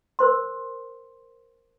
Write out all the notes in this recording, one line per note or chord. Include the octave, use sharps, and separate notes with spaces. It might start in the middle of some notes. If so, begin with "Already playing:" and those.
A#4 C5 C6